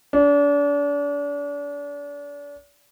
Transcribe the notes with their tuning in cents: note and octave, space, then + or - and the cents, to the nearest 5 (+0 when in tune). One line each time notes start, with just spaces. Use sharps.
D4 -35